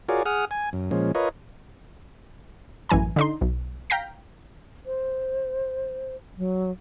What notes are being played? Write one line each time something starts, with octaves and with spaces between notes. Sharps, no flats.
F4 F#4 G#4 A#4 C#5 D5
G#4 F#5 D#6 F6
G#5
F#2
A#2 F3 G#3 C#4
F4 A#4 B4 C#5 D#5
A1 F#2 E3 G#5 A#5
D3 D#4 C6
B1
F5 G5 A#5 G6 A#6 B6
C5
F#3